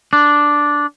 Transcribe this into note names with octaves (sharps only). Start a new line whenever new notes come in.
D4